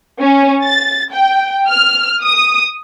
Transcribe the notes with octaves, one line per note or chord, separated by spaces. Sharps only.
C#4
A6
G5
F6
D#6